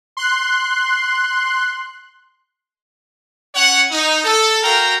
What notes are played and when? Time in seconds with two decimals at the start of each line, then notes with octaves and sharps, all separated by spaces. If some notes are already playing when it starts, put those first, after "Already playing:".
0.17 C6 F#6
3.55 C#4 C#5 F#5
3.91 D#4
4.24 A4
4.63 F#4 A#4 F5 G5 A#5